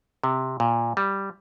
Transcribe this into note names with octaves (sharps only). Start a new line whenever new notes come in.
C3
A#2
G3